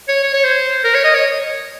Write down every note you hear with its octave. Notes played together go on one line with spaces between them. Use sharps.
C#5
C#5
C#5
C5
A#4
C#5
D#5
C#5